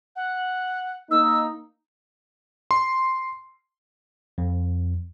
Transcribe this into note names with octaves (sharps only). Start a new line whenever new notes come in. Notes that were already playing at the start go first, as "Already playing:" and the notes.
F#5
A#3 D#4 E6
C6
F2